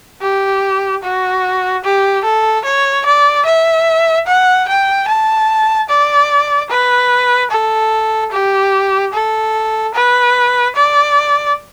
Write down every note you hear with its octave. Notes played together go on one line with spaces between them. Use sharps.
G4
F#4
G4
A4
C#5
D5
E5
F#5
G5
A5
D5
B4
A4
G4
A4
B4
D5